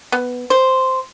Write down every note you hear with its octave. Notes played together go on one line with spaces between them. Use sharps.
B3
C5